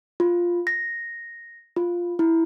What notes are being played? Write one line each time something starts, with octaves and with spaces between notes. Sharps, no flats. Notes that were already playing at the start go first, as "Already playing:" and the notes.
F4
A#6
F4
E4